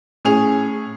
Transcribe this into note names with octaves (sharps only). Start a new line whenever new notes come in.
A2 C#4 G#4 F7